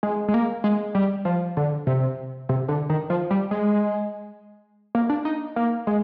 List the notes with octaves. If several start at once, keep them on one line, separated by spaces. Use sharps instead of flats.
G#3
G#3
A#3
G#3
G3
F3
D3
C3
C3
D3
D#3
F3
G3
G#3
A#3
D4
D#4
A#3
G#3